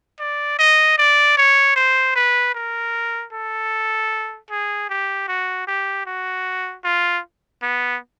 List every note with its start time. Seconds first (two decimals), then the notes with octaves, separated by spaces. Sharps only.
0.20 D5
0.59 D#5
0.98 D5
1.37 C#5
1.76 C5
2.16 B4
2.55 A#4
3.33 A4
4.50 G#4
4.90 G4
5.28 F#4
5.67 G4
6.06 F#4
6.84 F4
7.63 B3